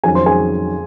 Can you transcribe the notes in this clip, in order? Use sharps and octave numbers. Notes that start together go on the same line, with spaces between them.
F2 D#3 F#3 C#4 G#4 G#5
C5 C6
G#4 G#5